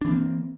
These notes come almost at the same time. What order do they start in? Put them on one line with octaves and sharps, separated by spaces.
D4 E3 C4 A#3